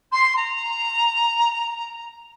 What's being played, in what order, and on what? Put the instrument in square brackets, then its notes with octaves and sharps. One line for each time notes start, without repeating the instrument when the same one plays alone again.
[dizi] C6
A#5